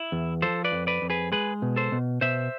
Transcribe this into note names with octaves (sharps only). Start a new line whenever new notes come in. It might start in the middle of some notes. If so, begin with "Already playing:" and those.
Already playing: E4
E2
F3 A4 C5
B4 D5
F2
B4 D5
F2
G#4 B4
G#3 G#4 B4
B2
A4 C5
B2
B2 C5 E5